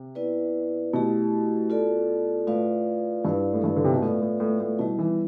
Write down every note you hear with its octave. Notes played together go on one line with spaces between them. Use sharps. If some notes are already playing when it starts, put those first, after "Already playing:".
Already playing: C3
B3 E4 B4 D5
B2 A3 E4 G4
F4 A4 D5
A2 F4 B4 D5 F5
G2 E4 B4 D5 F5
A2
G2
D3
C3
B2
A2 B3 F4 B4 D5 F5
A2
A2
A2
B2 G3 B3 E4
E3